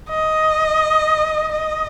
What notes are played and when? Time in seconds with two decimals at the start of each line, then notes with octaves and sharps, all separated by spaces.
0.10 D#5
1.52 D#5